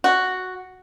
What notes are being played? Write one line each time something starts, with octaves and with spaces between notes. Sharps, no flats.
F#4